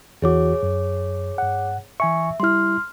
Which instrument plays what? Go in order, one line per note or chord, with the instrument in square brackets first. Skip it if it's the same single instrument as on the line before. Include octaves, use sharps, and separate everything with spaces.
[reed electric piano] E2 E3 F#4 [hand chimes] G#4 C#5 D6
[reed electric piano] F#2
G2 F#5
[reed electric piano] E3 G#5 C#6 [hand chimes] E5
[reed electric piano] G3 E4 [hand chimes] C6 F6